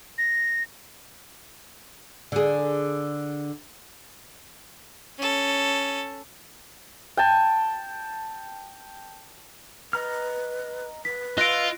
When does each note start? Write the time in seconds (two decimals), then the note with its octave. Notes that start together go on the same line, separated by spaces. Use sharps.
0.18 A#6
2.32 D3 G#4
5.18 C#4 A4
7.17 G5 A5
9.93 B4 D#5 A#5 F6
11.05 B4 B6
11.38 F4 D#5 E6 F#6 A#6 D7